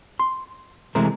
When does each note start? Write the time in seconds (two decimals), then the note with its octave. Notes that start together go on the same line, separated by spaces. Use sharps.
0.19 C6
0.95 C3 E3 G#3 A3 C4 A#4